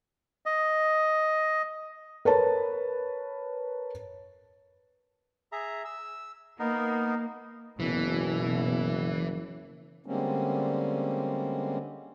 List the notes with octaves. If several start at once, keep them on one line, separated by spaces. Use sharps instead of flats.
D#5
A#4 B4 C#5 A5
G#4 E5 A#5
E6
A#3 B3 D#4 A#4
F#1 B2 E3
D3 G3 G#3 A#3 C4 C#4